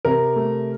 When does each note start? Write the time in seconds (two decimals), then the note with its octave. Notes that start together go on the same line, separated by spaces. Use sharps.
0.05 C3 A#4
0.36 A3